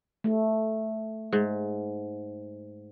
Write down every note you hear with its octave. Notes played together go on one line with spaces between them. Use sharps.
A3
G#2